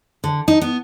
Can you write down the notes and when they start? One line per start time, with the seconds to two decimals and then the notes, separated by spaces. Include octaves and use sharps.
0.24 D3
0.48 D#4
0.61 B3